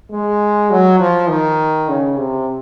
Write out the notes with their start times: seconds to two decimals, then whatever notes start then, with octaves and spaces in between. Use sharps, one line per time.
0.11 G#3
0.70 F#3
0.99 F3
1.29 D#3
1.89 C#3
2.17 C3